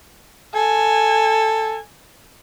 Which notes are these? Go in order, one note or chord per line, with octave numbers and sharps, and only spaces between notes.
A4 G#5